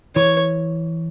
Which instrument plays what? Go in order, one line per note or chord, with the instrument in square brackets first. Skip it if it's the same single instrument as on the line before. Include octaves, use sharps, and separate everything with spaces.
[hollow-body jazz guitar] E3 [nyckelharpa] C#5